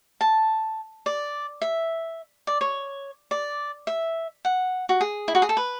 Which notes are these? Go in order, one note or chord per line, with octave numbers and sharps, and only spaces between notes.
A5
D5
E5
D5
C#5
D5
E5
F#5
F#4
G#4
E4
F#4
G#4
A4
B4